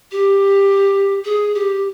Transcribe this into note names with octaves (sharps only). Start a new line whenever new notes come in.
G4
G#4
G4